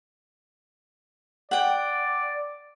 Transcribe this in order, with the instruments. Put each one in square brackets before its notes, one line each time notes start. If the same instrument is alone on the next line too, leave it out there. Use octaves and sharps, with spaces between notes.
[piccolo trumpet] D5 [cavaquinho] F#5 G5